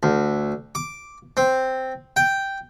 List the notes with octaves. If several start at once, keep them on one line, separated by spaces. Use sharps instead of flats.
D2
D6
C4
G5